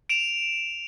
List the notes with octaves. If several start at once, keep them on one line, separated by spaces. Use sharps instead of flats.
D7 E7 F7